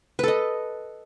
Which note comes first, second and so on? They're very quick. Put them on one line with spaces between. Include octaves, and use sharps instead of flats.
B4 A4 D#5